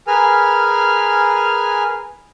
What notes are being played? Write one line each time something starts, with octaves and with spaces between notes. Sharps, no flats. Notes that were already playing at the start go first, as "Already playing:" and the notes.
G#4 A#4 B4 G#5 F6